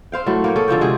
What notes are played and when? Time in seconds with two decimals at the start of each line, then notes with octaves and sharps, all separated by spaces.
0.12 C4 C5 F5 G5
0.26 A2 F#3 A3
0.44 A#3 C#5 G5
0.56 C#4 G#4 A4
0.68 D3 F3 C4 G5
0.81 C3 G#3 F#4 G#4